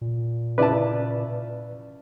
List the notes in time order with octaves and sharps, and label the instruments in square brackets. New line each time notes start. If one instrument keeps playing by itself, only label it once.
[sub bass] A#2
[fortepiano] C#3 E4 A5 [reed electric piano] B4 D5